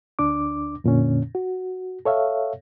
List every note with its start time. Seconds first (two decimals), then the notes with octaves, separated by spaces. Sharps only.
0.19 D2 D4 D6
0.84 F2 A#2 D3 C#4
1.35 F#4
2.05 A4 C#5 E5 F5